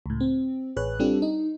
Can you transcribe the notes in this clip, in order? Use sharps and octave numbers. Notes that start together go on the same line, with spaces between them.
C#2 A2
C4
A1 G#4 B4 C#5 F#6
G3 C4 D4 F4 G4 A4
D#4